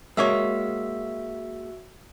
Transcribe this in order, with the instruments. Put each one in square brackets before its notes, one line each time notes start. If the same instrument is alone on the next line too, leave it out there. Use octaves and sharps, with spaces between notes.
[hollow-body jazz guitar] G#3 A#3 C#5 [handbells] F#4 E5 E6